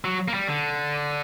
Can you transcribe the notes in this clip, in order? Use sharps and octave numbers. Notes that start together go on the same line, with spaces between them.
F#3
A#3
G3
D3